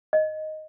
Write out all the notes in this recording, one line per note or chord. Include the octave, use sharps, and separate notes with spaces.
D#5